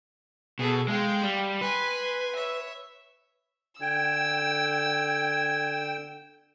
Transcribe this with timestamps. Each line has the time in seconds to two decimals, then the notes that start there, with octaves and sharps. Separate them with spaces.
0.59 B2 G#4 A4
0.88 G#3 F5 G5
1.22 G3
1.61 B4 G#5 C6
2.36 C#5 E5
3.81 D3 G5 G#5 E6